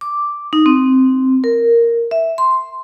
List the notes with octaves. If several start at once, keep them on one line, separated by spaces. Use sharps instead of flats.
D6
D#4
C4
A#4
E5
C6